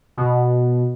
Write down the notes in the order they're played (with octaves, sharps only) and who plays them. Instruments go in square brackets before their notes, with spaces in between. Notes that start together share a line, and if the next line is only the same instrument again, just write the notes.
[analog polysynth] B2